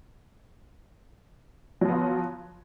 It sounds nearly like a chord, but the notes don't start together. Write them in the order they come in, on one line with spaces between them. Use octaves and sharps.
F#3 F3 B3 F4